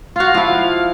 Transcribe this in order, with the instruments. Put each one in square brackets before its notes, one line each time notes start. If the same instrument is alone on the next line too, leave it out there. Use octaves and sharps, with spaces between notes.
[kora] F4 F#4 [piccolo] F5
[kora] F3 E4